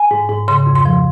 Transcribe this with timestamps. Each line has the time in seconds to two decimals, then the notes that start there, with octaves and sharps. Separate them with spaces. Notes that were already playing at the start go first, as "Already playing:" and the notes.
Already playing: G#5
0.11 G#2
0.29 G#2
0.48 C#3 C6
0.66 F2
0.75 C6
0.85 F3